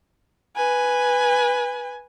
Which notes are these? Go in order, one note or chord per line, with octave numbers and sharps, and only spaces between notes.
B4 G#5